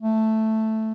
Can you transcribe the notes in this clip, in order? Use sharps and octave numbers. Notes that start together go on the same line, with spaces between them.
A3